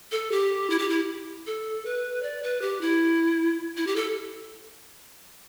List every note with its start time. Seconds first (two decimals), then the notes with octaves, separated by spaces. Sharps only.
0.12 A4
0.32 G4
0.70 E4
0.79 G4
0.89 E4
1.47 A4
1.85 B4
2.23 D5
2.43 B4
2.62 G4
2.81 E4
3.77 E4
3.87 G4
3.96 A4